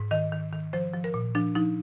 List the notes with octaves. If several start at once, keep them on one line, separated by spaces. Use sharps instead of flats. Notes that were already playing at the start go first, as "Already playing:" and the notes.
Already playing: G#2
D#3 D#5
D#3
D#3
F3 C5
F3
A#4
A#2
F3 D4
F3 D#4